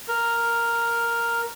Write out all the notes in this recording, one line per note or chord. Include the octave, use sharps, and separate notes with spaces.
A#4